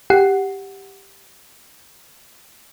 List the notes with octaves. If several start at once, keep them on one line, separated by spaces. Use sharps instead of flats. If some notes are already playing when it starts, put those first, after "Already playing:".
G4 F#5 C7